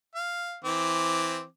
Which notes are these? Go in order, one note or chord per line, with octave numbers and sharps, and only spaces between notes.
F5
E3 C4 D6